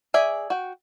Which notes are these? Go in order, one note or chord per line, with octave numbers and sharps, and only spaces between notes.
G#4 D5 E5 G#5
F#4 G5